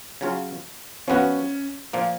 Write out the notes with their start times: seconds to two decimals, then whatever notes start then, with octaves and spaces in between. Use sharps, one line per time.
0.21 C#3 F#3 C#4 F4
1.08 F3 B3 C#4 F#4
1.93 A#2 F3 A#3